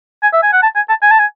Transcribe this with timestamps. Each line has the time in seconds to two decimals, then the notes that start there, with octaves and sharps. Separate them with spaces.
0.23 G#5
0.33 E5
0.43 G#5
0.53 F#5
0.63 A5
0.76 G#5
0.89 A5
1.02 G#5
1.11 A5
1.19 G#5